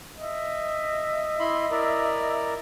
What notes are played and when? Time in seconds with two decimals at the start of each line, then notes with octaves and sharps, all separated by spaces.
0.19 D#5 E5
1.40 E4 B5 C6
1.71 E4 A#4 D5